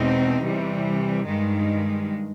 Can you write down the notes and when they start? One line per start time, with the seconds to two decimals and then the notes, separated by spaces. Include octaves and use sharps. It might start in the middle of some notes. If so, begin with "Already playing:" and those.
Already playing: E2 B2 G#3 C4 D#4
0.42 C3 E3 G3
1.27 G2 D#3 G#3